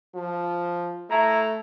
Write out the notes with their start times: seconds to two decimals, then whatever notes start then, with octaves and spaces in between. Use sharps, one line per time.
0.15 F3
1.10 A2 A3 E4 A#5